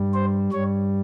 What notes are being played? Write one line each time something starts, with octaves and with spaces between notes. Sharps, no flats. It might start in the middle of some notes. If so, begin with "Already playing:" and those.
Already playing: G2 G3
C5
G2 G3 C#5